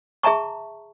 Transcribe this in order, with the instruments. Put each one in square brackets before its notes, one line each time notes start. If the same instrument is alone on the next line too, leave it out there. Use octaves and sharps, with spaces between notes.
[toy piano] G#4 E5 A5 A#5 C#6